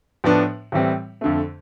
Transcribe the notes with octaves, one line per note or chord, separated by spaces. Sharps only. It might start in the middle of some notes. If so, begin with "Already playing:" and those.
A2 F3 B3 D4
A2 E3 G3 C4
F2 D3 A3